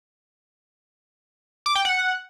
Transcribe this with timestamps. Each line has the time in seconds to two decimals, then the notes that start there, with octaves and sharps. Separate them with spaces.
1.66 D6
1.75 G5
1.85 F#5